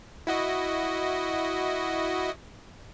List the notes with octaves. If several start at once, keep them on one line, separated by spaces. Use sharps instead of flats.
E4 F#4 D#5